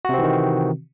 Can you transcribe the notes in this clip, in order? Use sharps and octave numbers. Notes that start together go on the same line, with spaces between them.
C3 D#3 E3 C4 F#4